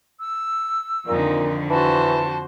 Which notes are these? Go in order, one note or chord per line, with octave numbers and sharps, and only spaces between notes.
E6
F2 A#2 D3 D#3 D#4
E3 F#4 C5 A5